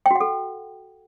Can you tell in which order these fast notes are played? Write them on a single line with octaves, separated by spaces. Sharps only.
G5 F#4 F#5 A4